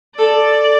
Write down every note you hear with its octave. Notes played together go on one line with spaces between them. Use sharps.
A4 D5